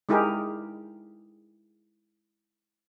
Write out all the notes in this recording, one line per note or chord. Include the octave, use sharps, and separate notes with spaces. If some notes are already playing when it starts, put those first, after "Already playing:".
G#3 D#4 E4 G4 G#4 A#4